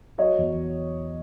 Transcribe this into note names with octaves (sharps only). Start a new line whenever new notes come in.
F#3 C#5 D#5
E2